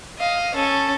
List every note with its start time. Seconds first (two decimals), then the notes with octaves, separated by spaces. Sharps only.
0.18 D#5 F5
0.54 C#4 A4